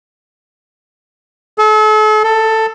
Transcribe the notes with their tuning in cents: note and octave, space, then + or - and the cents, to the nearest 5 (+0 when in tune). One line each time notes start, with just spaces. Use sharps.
A4 -40
A4 +10